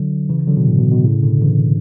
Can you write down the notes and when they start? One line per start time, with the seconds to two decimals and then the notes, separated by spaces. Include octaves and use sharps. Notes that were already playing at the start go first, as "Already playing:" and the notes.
Already playing: D3 F#3
0.30 C#3 E3
0.47 D3 F#3
0.57 B2
0.67 A2
0.79 B2
0.92 B2
1.04 A2 C#3
1.23 B2 D3
1.37 D3
1.42 C#3 E3